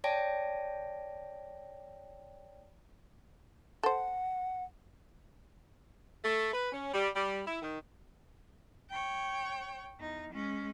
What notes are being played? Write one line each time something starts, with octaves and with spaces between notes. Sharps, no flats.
C#5 D5 G5 A5 A#6 D7
A4 C5 F#5
A3
B4
C#4
G3
G3
E4
D#3
C#5 G5
E2 D#4
G#3 C#4